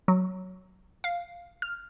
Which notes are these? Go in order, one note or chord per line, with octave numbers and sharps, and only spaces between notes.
F#3
F5
F6